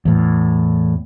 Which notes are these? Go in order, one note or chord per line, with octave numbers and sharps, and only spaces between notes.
E2 A2